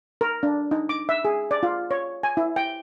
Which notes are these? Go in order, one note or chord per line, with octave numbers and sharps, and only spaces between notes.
A#4
D4
D#4
D6
E5
G#4
D5
F4
C#5
G#5
E4
G5